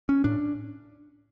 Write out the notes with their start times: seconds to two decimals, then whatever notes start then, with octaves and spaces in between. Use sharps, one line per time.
0.09 C#4
0.24 A2 D4